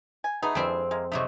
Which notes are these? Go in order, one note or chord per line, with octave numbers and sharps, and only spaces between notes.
G#5
A3 B3 D#4 G#4
F2 E3 G3 C4 D4 E5
G#3 A#3
C3 F#3 A3 D#4 C#6